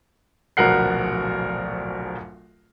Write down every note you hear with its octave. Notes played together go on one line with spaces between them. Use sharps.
D1 A#1 B2 A#4 F#5 C7